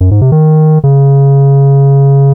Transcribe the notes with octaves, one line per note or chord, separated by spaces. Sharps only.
F#2
G#2
C3
D#3
C#3